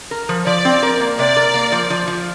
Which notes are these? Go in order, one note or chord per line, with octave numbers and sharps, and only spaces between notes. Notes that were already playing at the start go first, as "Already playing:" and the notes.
A#4
F3
F3 D5
C4
A#4
A#3
C3 D5
A#4
A#3
F3
F3
F3